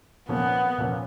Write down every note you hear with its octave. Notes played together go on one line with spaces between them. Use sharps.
A#2 F3 A#3 B3 C#4
A#2 F3 A#3 C#4